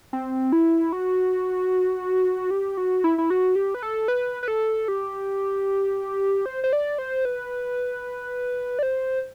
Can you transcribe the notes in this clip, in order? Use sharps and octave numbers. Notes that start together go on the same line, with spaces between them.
C4
E4
F#4
G4
F#4
E4
E4
F#4
G4
B4
A4
B4
B4
A4
G4
C5
C5
D5
C5
B4
D5
C5